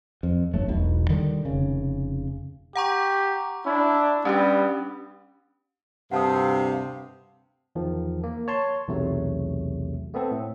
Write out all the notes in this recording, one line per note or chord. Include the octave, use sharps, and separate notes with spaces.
F2
G1 F#3 A3
E1 B1 B2
D3 D#3 G3
F1 C#3
G4 F#5 A#5 C#6
D4 E4
G3 B3 C#4 D4 G4
D2 G2 C3 F5 F#5 A5 D#6
E2 D#3 F3
A#3
C#5 A5 C6
B1 E2 C3 F#3 A3
A3 B3 C4 A4
A2